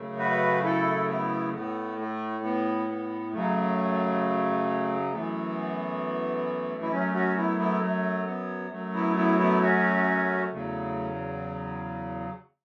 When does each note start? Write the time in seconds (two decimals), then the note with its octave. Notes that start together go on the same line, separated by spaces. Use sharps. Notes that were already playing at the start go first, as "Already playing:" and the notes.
Already playing: F#2 C#3 A3
0.19 F#4 B4
0.64 E4 A4
1.08 B3 E4
1.54 A2 A3 B3
1.99 A3
2.44 B3
2.89 B3
3.33 F#2 C#3 F#3 A3
5.12 F#2 E3 A3 B3
6.82 E4
6.92 F#2 F#3 A3 C#4
7.14 C#4 F#4
7.37 B3 E4
7.59 B3 E4
7.82 A3
8.26 B3
8.71 F#2 F#3 A3
8.94 B3 E4
9.16 B3 E4
9.39 B3 E4
9.61 C#4 F#4
10.51 E2 C#3 F#3 A3